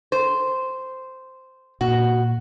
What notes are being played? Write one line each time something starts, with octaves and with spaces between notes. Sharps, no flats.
C5
A#2 F#4